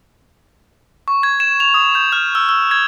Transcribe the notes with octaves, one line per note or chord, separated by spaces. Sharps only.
C#6
G#6
E7
F7
D#6
G6
F6
E6
E6
G#6